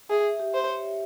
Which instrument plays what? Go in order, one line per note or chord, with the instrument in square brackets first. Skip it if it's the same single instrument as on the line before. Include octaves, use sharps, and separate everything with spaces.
[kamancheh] G#4 [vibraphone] E5
[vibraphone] G4
[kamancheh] C5
[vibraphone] C#5